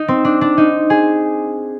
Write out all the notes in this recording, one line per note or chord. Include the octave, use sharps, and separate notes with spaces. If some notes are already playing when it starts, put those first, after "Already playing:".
Already playing: D#4
C4
D4
D4
D#4
G#4